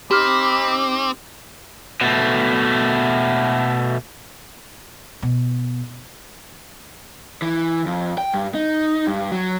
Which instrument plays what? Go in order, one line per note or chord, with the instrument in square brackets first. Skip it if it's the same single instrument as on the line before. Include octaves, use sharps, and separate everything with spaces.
[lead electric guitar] C4 [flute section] D#4 D6 [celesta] G4 F6 [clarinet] B5
[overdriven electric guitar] B2 A3
[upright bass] B2
[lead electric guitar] E3
F2
G5
G2
D#4
G2
F#3